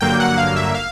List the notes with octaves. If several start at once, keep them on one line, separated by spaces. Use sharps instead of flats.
G2 D3 F#3 A#3 G5
F#5
F5
E5
F5